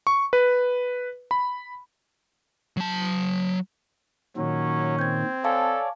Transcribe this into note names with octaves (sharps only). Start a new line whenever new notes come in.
C#6
B4
B5
F#3 A5
A#2 D#3 F#3 C#4
C4 G6 G#6
A4 C#5 D5 F5 G#5 A5